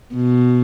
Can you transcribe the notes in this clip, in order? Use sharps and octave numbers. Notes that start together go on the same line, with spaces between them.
B2